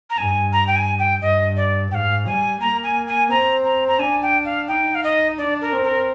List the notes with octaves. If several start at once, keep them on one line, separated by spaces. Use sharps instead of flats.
A#5
G2 G#5
A#5
G5
G#5
G5
G2 D#5
D5
G#2 F5 G5
G3 G#5
A#3 A#5
G#5
G#5
C4 A#5
A#5
A#5
D4 G#5
G5
F5
D#4 G5
F5
D#5
D4 D5
A#4
C4
A#4